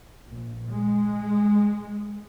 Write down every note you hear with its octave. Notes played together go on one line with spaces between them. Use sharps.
A#1
G#3